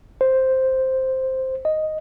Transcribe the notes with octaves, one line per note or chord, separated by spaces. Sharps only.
C5
D#5